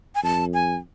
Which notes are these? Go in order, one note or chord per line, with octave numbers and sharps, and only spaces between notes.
G#5
F2 A5
G#5